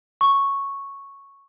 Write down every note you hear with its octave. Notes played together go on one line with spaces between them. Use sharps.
C#6